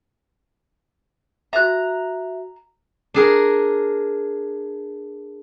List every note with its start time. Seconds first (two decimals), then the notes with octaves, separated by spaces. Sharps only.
1.53 F#4 E5 A#5 F#6
3.14 D4 G#4 A#4